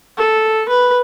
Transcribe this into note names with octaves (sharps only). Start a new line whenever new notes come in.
A4
B4